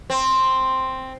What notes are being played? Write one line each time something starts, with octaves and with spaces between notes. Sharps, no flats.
C4